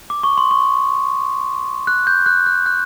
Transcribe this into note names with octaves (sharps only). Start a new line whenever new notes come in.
D6
C#6
C6
C#6
F#6
G6
F#6
F#6
F#6